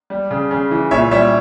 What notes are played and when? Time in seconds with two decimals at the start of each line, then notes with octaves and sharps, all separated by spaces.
0.10 G3
0.31 C#3
0.51 C#3
0.71 E3
0.91 A#2 C#5 E5
1.11 G3 C#5 E5